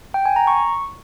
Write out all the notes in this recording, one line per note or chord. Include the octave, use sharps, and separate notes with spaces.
G5
G#5
A#5
C#6